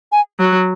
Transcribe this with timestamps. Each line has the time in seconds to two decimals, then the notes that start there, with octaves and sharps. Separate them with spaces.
0.12 G#5
0.40 F#3